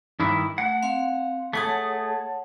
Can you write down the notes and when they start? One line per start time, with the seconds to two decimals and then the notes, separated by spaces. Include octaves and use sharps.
0.20 G2 D#3 E4
0.58 A3 F#5
0.82 C4 F5 C6
1.53 A3 G#4 C#5 F#5 A5